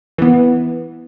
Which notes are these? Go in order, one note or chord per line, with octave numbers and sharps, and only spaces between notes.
E3 B3